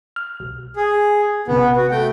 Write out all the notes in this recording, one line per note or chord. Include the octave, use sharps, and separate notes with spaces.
F6
B1
G#4
A1 C3 B3
F#4
A3 G5